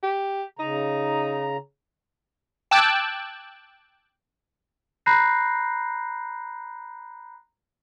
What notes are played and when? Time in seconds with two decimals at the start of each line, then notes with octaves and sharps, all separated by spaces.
0.03 G4
0.59 C#3 D#4 A#5
2.71 G5 A5 D6 E6 F#6 G#6
5.06 A#5 B5 F#6 G6 A#6 C7